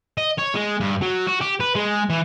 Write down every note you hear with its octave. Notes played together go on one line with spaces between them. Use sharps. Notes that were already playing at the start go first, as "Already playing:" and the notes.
D#5
C#5
G#3
G2
F#3
F#4
G4
B4
G#3
E3